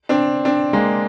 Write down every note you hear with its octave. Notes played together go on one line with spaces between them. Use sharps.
C4 D4
C4 D4
G#3 A#3